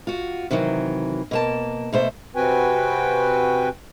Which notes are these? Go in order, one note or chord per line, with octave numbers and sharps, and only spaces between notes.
F4 F#4
C3 D#3 E3 F#3
B2 A#3 A5
B2 A3 C5 E5
C3 C4 F#4 B4 G5 G#5